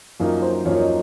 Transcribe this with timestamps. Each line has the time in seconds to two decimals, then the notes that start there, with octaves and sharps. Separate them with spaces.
0.20 F#2 F3 A#3 D#4
0.42 C5
0.65 F#2 F3 A#3 D#4 C#5
0.81 D#5